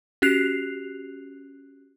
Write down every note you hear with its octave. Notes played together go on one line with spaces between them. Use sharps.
C#4 F#4 G4 F#6 C7 F7